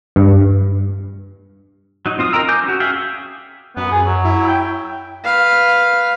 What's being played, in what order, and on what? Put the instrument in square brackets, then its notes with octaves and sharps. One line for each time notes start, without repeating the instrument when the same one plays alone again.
[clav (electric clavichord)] G2
[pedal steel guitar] F#3 D#4
C4 F4 D#6
A#4 D#5 G5 A#5 E6
G#5 D6 G6
C#4 F#4
G#4 E5 F5 G5
[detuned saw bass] F#2 [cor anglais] B3
[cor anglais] G#4
F#3
[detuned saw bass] E4
[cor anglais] G5
[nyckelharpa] B4 F5